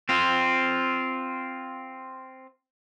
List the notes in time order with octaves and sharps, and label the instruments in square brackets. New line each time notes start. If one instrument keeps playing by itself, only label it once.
[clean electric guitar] C4 F4